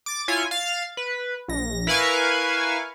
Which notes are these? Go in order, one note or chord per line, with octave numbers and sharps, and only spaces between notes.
D6 A6
E4 F4 C#5 G#5
F5 A6
B4
A#1 A#6
E4 A#4 B4 F5 G#5 C#6